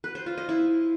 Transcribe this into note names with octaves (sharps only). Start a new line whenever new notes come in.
B4
C5
F4
D#5
E4